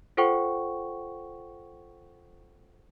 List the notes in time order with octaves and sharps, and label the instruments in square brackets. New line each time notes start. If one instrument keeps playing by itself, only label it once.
[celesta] F4 A4 C5 F#5 G5 C#6